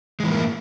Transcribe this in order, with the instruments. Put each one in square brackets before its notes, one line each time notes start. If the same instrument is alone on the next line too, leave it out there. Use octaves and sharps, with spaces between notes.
[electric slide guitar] G#3
E3
A2
A#3